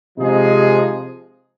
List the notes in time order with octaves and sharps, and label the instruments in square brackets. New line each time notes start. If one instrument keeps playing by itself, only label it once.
[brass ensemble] C3 F3 G#3 D#4 G#4